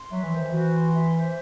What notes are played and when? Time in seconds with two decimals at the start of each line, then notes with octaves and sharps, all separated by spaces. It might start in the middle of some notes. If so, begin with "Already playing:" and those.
Already playing: C6
0.11 F#3 E5
0.23 E3
0.32 D#3 C5
0.46 E3
0.52 F#4
0.74 C6
0.94 E5
1.15 C5